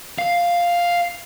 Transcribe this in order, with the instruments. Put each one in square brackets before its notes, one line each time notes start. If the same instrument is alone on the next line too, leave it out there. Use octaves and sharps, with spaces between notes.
[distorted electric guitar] F5